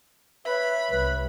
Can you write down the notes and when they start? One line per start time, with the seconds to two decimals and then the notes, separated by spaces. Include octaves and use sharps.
0.45 B4 C#5 E5 B5
0.90 C2 G3 B4